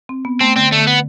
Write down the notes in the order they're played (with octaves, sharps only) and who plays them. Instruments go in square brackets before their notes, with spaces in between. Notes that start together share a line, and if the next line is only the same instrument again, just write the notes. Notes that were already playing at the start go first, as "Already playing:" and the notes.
[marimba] C4
B3
[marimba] A3 [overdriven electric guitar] C4
[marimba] D3 [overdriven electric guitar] C4
[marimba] D3 [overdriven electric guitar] A3
[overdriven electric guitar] B3